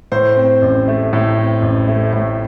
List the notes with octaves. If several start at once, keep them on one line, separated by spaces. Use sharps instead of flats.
A2 C5
C4
A1
A3
A2
C4
A1
A3
A2